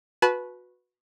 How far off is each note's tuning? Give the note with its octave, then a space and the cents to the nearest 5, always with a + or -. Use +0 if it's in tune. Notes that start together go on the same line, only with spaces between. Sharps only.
F#4 -25 B4 -5 A5 -35